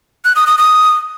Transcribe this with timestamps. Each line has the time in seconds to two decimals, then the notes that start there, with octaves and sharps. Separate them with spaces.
0.25 F#6
0.36 D#6
0.47 D#6
0.58 D#6